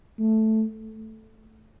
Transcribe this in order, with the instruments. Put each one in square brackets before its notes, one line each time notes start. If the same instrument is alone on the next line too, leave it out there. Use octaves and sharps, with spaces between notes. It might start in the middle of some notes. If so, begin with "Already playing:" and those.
[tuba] A3